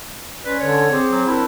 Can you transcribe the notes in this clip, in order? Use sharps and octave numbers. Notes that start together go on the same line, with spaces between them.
C#4 B4 D5 C6
D3 C#5
C4 G#4 F#5 D6
F#3
D4 E4 A#4 E6